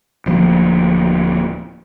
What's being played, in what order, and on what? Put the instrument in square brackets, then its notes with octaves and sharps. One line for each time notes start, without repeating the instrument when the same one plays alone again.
[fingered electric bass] D1 F3 A#3